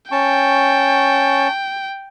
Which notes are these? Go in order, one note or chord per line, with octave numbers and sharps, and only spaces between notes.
C#4 G5 A5 C#6